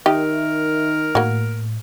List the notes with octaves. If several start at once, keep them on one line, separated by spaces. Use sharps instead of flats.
D#3 G4 A#4 D#5 E5
A2 A#3 F#4